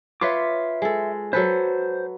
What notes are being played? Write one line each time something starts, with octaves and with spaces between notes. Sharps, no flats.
F4 B4 C#5 E5 C6 D6
G#3 A4
F#3 A4 B4 C5